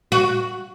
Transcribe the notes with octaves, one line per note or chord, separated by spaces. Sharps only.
F#4